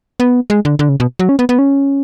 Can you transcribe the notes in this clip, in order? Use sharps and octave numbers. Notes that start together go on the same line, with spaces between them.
B3
G#3
D3
D3
C#3
B2
F#3
C#4
B3
B3
C#4